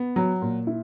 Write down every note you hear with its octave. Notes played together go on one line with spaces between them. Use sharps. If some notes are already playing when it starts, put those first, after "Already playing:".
Already playing: B3
F#3
A#2
E4